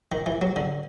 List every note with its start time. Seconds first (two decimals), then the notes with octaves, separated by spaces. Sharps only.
0.12 D#3
0.26 E3
0.42 F#3
0.56 D3